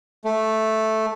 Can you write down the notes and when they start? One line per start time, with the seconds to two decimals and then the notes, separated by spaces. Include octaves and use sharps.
0.25 A3